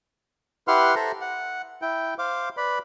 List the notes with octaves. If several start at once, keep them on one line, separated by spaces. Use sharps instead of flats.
E4 G4 B4 F#5 C6 F6
A4 C5 E5 A#5
F#5
E4 G5
C5 F5 D6
B4 D5 B5